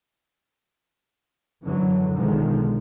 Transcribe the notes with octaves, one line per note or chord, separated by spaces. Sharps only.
F#2 D3 E3 F#3
B1 D3 D#3 F3 G#3